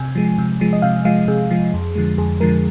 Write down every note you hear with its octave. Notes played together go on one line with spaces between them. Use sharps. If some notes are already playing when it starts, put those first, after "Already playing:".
Already playing: C3 G#5
F3 G#3
C3
F3 G#3
D#5
C3 F5
F3 G#3 F5
C3 G#4
F3 G#3
F2
D3 F3 G#3
F2 G#4
D3 F3 G#3 A#4